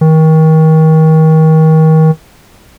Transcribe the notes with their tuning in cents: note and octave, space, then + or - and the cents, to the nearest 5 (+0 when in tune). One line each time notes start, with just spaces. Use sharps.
D#3 +30